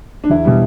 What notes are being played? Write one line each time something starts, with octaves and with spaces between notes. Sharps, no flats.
D4
E2 E4
B2 G3